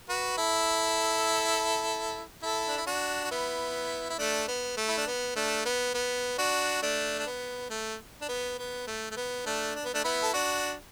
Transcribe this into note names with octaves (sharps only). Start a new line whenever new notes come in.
F#4 B4
E4 A4
E4 A4
D4
E4
D4 F#4
F#4
B3 E4
E4
A3 D4
B3
A3
E4
D4
B3
A3 D4
B3
B3
D4 F#4
A3 D4
D4
B3
A3
D4
B3
B3
A3
A3
B3
A3 D4
D4
B3
A3 D4
B3 E4
A4
D4 F#4